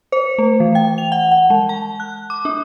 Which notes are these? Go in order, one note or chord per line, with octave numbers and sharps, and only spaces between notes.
C5
A3
E3
G5
F7
F#5
F#5
G#3
A5
F#6
D6
D4